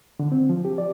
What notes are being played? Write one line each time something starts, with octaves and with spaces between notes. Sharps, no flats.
D3
C4
F3
G4
D5